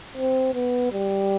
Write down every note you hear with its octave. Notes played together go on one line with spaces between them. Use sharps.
C4
B3
G3